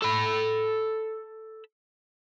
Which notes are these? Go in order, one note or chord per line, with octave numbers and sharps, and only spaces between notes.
A4 B5